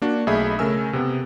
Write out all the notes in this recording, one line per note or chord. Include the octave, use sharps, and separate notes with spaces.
A#3 D4 F#4
B1 A3 G#4 D#5 E5 B5
C#3 A3 A#4 G#5 E6
C3 B3